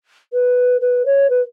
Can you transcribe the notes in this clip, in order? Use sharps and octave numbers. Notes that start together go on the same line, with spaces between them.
B4
B4
C#5
B4